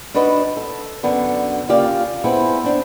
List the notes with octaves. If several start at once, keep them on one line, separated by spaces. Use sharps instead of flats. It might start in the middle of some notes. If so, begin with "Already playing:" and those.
D4 D#4 F#4 B4 D#5
A4
F#2 D3 B3 D4
C#3 A#3 F4 G4 D5 F5
B3 C4 E4 G#4
C4 D4